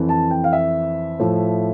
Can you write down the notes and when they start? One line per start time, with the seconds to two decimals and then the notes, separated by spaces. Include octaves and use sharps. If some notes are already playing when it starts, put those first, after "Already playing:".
Already playing: F2 E3
0.09 A5
0.31 G5
0.44 F5
0.53 E5
1.20 A2 F3